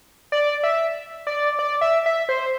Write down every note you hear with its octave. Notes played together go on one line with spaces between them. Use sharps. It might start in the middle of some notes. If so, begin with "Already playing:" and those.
D5
E5
D5
D5
E5
E5
C5